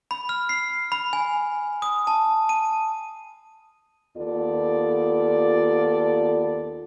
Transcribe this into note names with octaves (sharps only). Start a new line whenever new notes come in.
B5
F6
C7
B5
G#5
D#6
A5
D#7
D#2 B3 F4 A4 D5